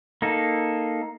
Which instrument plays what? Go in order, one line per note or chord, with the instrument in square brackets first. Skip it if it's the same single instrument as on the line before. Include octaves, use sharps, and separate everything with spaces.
[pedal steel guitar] A#3 D#4 A4